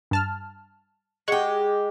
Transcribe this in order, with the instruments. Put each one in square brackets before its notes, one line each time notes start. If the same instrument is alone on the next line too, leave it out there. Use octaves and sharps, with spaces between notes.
[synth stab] G2 A5 F6
[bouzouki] G#3 G4 [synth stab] F#5 C#6